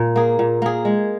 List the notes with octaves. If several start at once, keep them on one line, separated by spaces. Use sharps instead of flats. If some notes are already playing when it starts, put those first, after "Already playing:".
Already playing: A#2 F4
A#3 G#4
A#2
A#3 G#4
G#3